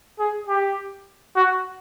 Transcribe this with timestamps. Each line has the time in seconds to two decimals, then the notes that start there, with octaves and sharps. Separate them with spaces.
0.19 G#4
0.48 G4
1.36 F#4